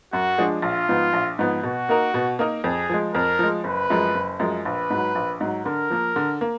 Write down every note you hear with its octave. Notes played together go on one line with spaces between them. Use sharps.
F#2 F#4
F3 G#3 D4 G#4
A#1 F4
G#2 F3 B3
A#1
G#2 F3 B3
B2 F#4
A#3 D#4 A#4
B2
A#3 D#4 A#4
F2 G#4
F3 G#3
F2 A#4
F3 G#3
F#1 B4
F#2 F3 G#3
F#1
F#2 F3 G#3
A#1 B4
G#2 F#3
A#1
G#2 F#3
D3 A#4
F3 A#3
D3
A#3